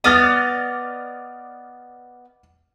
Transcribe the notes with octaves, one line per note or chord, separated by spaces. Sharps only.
B3 D5 D#5 D6 F6 A6